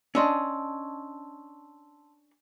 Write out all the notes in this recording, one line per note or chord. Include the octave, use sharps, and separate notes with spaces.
C#4 D4 D#5 A5 C6 E6